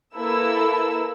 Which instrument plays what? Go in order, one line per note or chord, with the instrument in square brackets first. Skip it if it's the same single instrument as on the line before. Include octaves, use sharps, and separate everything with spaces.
[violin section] A#3 E4 A4 B4 E6